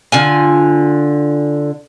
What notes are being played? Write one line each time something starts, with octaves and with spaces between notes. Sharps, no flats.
D3 F4 G#5